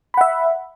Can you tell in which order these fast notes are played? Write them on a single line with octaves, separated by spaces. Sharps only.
B5 F#5 E5